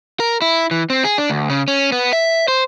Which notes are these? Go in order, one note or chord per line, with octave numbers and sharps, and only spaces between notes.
A#4
E4
E3
C4
G#4
D4
D2
C#3
C#4
B3
E5
C5